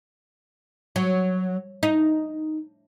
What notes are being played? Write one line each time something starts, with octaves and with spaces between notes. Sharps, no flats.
F#3
D#4